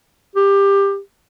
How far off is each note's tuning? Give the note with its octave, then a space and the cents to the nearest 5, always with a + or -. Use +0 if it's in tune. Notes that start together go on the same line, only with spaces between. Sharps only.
G4 +20